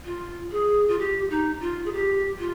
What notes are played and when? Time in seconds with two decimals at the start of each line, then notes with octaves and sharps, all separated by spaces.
0.04 F4
0.51 G#4
0.88 F4
0.98 G4
1.29 D#4
1.60 F4
1.85 G#4
1.92 G4
2.39 F4